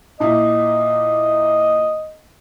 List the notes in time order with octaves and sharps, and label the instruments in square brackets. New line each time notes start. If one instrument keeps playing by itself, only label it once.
[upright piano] A#2 A#3 E4 [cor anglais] D#5